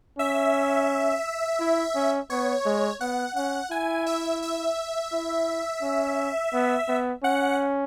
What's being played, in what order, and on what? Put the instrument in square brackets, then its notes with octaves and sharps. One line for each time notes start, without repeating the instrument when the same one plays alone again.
[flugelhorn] C#4 [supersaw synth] E5
[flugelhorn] E4
C#4
[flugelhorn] B3 [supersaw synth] C#5
[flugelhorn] G#3
[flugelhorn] B3 [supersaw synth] F#5
[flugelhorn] C#4 [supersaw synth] F#5
[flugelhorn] E4 [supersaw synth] G#5
[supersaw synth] E5
E5
[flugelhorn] E4
C#4
B3
B3
[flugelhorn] C#4 [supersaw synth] F#5